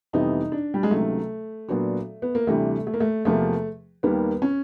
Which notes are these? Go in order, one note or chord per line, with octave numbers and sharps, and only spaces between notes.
F2 C3 E3 G3 B3 D#4
D4
G3
G#3
C#2 C3 D#3 F#3 A3
A#2 F#3 B3 D4 F#4
B3
A#3
D2 C3 E3 G3 A3
A3
A#3
A3
E2 C3 F3 A3 A#3
D#2 D#3 G3 A#3 B3
C#4